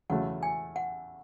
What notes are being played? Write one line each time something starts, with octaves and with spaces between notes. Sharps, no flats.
E2 C#3 F#3 A3 F#5
G#5
F#5